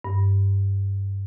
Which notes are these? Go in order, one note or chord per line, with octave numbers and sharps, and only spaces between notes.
G2